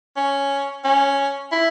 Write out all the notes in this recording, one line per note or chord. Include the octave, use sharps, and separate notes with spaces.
C#4
C#4
E4